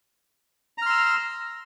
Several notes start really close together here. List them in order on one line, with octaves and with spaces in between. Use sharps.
A#5 F6 C6 E6